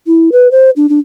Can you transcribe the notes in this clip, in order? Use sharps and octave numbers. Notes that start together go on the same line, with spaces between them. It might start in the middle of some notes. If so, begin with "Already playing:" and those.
E4
B4
C5
D4
D4